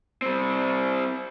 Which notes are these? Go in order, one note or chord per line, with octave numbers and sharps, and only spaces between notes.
G3 C4